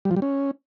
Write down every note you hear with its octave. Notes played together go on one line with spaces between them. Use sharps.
G3
F3
G3
C#4